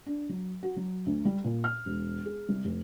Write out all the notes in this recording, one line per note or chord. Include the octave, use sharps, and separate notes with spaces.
D4
F#3
F#4
F#3
D2
G3
A#2
F6
E1
G#4
C2
F1